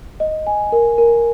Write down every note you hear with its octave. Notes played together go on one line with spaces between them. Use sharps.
D#5
G#5
A#4
A#4